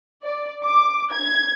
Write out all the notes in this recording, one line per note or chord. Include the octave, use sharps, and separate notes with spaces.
D5
D6
G#6